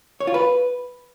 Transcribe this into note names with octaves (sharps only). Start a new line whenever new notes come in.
C#5
F4
B4